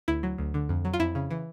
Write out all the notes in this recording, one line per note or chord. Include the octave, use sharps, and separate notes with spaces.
D2 E4
F#3
D2
D3
F2
F#3
F4
F2 E4
C#3
E3